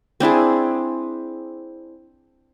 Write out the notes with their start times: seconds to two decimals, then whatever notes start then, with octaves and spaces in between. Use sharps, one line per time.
0.20 C4 D4 E4 G#4